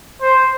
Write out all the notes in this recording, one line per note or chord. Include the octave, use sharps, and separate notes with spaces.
C5